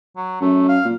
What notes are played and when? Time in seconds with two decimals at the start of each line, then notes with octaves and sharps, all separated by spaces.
0.16 F#3
0.41 F#2 A3
0.69 F5
0.85 A#2